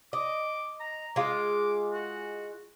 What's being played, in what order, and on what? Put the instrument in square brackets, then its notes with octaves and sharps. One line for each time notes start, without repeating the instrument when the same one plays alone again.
[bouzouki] D#5 [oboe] D6
[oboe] A#5
[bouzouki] G#3 F4 [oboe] D6
[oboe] F#4